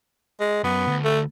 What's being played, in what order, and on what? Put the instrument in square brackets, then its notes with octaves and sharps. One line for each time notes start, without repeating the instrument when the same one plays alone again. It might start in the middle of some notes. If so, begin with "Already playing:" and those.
[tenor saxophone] G#3
[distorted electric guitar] F#2 [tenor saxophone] B3
[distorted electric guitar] D2
[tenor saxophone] A3